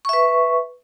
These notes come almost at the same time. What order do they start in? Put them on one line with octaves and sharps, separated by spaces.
C#6 E5 B4